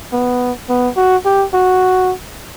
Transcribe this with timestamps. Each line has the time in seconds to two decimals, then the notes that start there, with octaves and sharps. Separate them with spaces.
0.12 B3
0.69 B3
0.97 F#4
1.26 G4
1.54 F#4